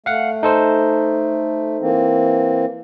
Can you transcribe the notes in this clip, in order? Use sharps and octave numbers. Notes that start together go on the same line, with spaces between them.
A3 F5 F#5
D#4 A4 C5
E3 A#3 C4